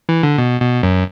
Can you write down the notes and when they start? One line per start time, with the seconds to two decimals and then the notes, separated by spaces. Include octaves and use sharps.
0.09 E3
0.23 D3
0.38 B2
0.61 B2
0.83 F#2